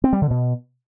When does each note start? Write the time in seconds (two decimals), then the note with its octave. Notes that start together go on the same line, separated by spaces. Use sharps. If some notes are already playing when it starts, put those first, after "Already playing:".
0.04 C4
0.13 G3
0.22 D3
0.30 B2